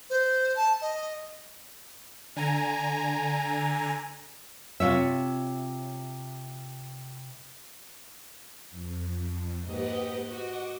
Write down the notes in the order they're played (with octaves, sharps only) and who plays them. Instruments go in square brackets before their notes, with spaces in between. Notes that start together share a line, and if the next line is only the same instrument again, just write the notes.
[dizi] C5
A5
D#5
[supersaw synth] D3 G#5 A#5
[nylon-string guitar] C3 F4 C#5 E5
[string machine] F2
[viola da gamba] G#2 A#3 D#5 [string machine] G4 B4 F#5
[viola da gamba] F#4 [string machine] D#5 F#5 D6